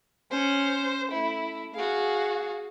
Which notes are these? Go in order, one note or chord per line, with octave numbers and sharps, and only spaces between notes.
C#4 C5
A3 E4
F#4 G#4 F5